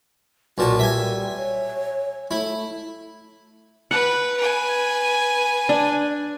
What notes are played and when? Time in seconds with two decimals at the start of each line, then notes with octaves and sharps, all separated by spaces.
0.58 B1 A#2 F#4 A5
0.79 G3 E5 G#5
1.37 C#5
2.31 A3 E4
3.91 B4 F#5
4.37 B4 G#5
5.69 D4